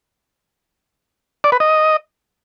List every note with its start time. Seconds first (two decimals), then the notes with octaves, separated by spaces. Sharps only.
1.44 D5
1.52 B4
1.60 D#5